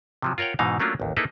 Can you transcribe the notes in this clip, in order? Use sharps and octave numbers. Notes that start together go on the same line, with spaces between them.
C3 F3 F#3
F4 A#4 C#5 F#5 G5
G#2 B2 E3 D#4 F5
F#3 A3 A#3 C#4 D4 F4
A1 D#2
A#3 D#4 E4 G#4 A4 B4